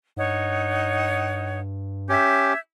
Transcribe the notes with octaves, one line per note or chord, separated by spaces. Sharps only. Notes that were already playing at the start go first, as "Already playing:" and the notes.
G2 D#4 C#5 F#5
C#4 G4 E5 G6 G#6